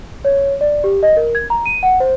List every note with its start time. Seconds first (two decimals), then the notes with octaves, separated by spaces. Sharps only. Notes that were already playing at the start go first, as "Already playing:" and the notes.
0.25 C#5
0.61 D5
0.84 G4
1.03 D#5
1.17 A#4
1.35 G#6
1.50 A#5
1.66 D#7
1.83 F#5
2.00 C5